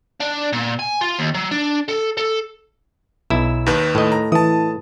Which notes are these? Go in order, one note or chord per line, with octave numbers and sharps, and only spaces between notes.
D4
A#2
G#5
F4
D#2
F#3
D4
A4
A4
B1 E4 E6
D#2 D#3 B4
A2 D#5
A#5
E3 A5 D#6